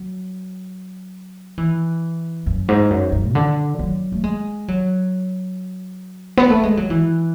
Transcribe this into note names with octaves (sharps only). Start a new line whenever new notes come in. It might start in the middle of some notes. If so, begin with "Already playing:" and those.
Already playing: F#3
E3
F#2
G#2
F#2
F#2
C#3
D3
F#3
A3
G#3
F#3
B3
A3
G#3
F#3
E3